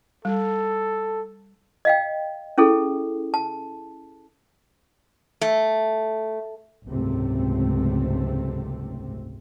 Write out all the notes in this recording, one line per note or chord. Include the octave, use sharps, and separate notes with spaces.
G3 A4
D#5 F5 G5
C#4 E4 G#4 A4
A5
A3
F#1 C#2 G#2 C3 A3 C4